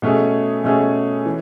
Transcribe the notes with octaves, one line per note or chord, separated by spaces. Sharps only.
B2 A3 C#4 G#4
B2 A3 C#4 G#4
E3